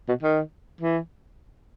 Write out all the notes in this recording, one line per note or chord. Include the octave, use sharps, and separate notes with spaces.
B2
D#3
E3